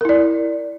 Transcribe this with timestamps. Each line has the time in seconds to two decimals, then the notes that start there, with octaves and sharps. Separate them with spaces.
0.01 A#4
0.05 E4
0.09 D5